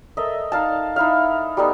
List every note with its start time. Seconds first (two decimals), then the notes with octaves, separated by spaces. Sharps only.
0.17 A4 A#4 D#5 E5
0.52 D#4 F5 A5
0.96 D#4 E4 E5 F5
1.57 G3 A3 B3 D#4